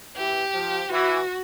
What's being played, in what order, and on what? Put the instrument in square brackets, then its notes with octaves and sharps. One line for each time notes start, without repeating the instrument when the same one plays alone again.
[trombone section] E3 [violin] G4
[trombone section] F3
[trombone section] E3 [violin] F#4